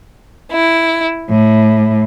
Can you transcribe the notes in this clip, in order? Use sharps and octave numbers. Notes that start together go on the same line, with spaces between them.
E4
A2